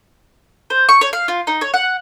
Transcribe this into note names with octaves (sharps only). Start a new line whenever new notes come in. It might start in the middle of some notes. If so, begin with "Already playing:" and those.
C5
C#6
C#5
F5
F4
D#4
C#5
F#5